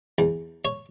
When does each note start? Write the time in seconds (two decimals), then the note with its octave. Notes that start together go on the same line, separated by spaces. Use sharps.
0.18 E2
0.65 C#5